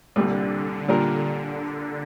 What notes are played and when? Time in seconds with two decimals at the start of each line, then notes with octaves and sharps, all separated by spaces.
0.16 C2 A#2 D3 G3
0.88 A#2 G3 D4 F4 A#4